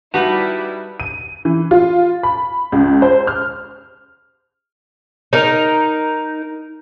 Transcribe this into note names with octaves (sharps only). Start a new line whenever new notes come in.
G3 D#4 E4 F#4 G4 B4 A5 B6
D#7
E3
F4
B5
C#2
C5
F6
D#4 A#4